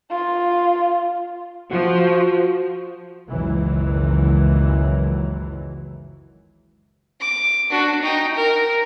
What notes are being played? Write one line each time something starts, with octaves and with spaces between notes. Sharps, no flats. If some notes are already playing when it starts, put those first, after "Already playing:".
F4
F3 F#4
F#1 C#2 D#3 E3 F#3
D6
D4 F#4
D#4 G5
A#4